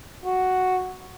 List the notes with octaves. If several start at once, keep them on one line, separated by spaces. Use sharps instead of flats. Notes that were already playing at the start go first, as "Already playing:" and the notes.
F#4